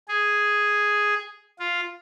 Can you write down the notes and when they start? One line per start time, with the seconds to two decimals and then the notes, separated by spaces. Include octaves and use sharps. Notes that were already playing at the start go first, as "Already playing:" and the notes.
0.08 G#4
1.60 F4